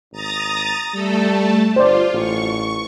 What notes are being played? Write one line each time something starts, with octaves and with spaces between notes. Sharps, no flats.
G#1 A#5 D#6 A6
G3 A3 A4
G1 F4 C5 D5
A1 C#6